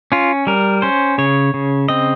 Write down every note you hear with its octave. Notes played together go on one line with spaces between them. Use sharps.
C#4 F4
G3 A#4
C#4 C5
C#3 C#5
C#3
C4 D#5